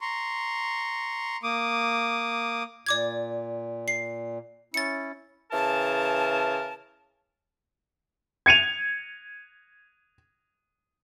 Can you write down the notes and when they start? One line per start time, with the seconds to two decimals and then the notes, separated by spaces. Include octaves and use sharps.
0.01 A#5 C6 C#6
1.43 A#3 D6 D#6
2.86 A#2 D5 D6 G#6
3.88 C7
4.74 C#4 E4 A6 C#7
5.52 C#3 E3 A#4 A5
8.46 G#6 C#7 D#7 F7